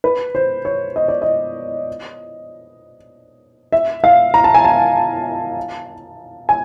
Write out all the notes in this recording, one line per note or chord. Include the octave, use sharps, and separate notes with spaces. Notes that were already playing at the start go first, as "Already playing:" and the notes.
B4
C5
C#5
D#5
D5
D#5
E5
F5
A#5
A5
G#5
A5
G#5